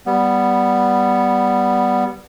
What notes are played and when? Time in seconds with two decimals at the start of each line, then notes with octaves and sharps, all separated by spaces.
0.06 G3 B3